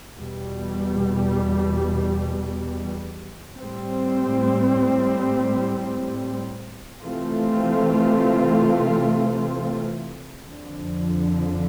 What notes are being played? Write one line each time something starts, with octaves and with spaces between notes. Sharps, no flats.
E2 B2 G3
A2 G3 C4
C3 E3 A3 C4 F4
F2 D3 F3